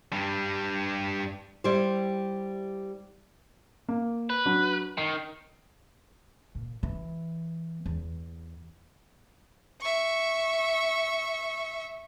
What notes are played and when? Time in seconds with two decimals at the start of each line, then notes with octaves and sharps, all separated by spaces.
0.13 G2 G3
1.64 G3 E4 G4 C5
3.89 A#3
4.30 B4
4.46 F#3 D4
4.98 D#3 C7
6.55 A#2
6.83 E3
7.86 E2
9.81 E5 C#6